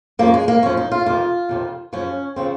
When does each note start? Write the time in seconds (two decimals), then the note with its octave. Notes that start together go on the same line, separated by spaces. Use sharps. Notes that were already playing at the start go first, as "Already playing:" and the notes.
0.19 F#2 F3 A#3
0.34 G#3
0.48 A#3
0.62 F#2 F3 C#4
0.77 D#4
0.92 F4
1.06 F2 C3 D#3 F4
1.49 F2 C3 D#3
1.93 F#2 C#3 F3 C#4
2.36 C#3 F3 C4